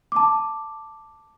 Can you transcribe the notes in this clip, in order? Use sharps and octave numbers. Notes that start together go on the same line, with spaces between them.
A5 D6